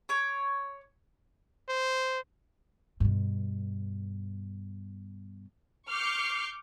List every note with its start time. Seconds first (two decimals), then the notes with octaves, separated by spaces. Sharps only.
0.09 C#5 D6
1.69 C5
3.00 G2 B2
5.88 C#6 D6 F6 G6 C7 C#7